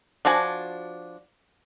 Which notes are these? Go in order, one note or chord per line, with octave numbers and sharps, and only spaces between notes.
F3 D4 F#4 G#5